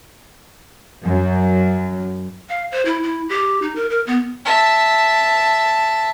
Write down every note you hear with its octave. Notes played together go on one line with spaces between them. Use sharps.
F#2
F5
C5
E4
E4
G4
D#4
A#4
A#4
B3
E5 A5